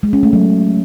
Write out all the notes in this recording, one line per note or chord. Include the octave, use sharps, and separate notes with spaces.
G#3
C#4
A3
F#3